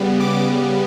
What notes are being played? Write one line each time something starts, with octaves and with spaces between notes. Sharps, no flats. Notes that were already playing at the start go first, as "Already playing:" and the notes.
Already playing: C#3 G3 B3
D6